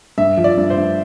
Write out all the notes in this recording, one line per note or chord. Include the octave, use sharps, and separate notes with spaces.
G2 E5
F3
D5
G2
C5
G2